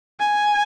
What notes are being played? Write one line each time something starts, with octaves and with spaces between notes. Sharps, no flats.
G#5